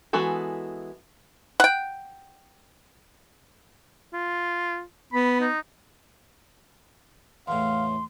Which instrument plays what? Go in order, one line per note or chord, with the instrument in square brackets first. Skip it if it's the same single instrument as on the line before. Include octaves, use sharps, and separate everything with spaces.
[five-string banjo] E3 G#3 B3 F#4 A4
[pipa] F#5 G5
[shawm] F4
[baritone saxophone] B3 [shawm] B5
[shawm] D#4
[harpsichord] E2 A2 [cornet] F5 [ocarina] C6